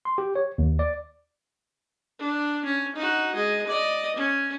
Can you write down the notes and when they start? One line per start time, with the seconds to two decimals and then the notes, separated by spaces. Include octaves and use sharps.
0.05 C6
0.18 G4
0.35 C#5
0.58 D#2
0.79 D5
2.19 D4
2.65 C#4
2.96 D#4 F#4
3.35 G#3 D#5
3.67 D5 D#5
4.16 C#4